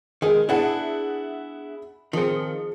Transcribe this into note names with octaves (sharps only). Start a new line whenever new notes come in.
D#3 G#3 G#4
B3 D4 E4 G#4 E5 F#5
D#3 F3 C4 G#4 C#7